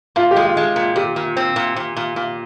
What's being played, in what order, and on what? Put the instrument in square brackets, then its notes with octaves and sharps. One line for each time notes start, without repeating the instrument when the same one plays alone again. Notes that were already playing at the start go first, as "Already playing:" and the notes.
[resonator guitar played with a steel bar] A#2 [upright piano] F4
[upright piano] G4
[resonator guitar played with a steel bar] G#3
[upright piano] F4
[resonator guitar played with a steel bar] G#3
A#2
[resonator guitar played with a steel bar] A#2 [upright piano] G4
[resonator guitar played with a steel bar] A#2
C4
A#2
A#2
A#2
A#2